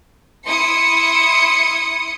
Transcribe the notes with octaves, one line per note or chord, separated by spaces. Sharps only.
E4 C6 D#6 C#7